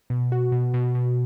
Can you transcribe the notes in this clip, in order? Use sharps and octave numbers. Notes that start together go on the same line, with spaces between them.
B2
F#4
B2
B2
B2